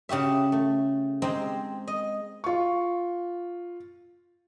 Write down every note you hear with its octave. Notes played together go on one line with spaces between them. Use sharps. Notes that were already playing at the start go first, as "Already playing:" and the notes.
C#3 F#4 G4 E5
A3
G#3 C4 D#4 G4
D#5
F4 C#6